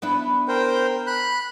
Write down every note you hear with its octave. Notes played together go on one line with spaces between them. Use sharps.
B3 D4 E4
A#4 C5 G5
B5 F#6